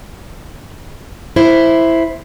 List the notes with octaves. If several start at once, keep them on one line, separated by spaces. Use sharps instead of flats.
E4 C5